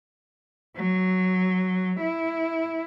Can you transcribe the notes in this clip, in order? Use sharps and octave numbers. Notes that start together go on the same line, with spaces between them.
F#3
E4